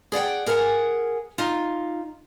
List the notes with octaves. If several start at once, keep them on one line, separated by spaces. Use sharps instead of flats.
G#4 D5 F#5 G5
G#4 A#4 B4 F5 F#5 G#5
D#4 F4